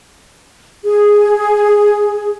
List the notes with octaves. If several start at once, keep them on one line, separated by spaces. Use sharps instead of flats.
G#4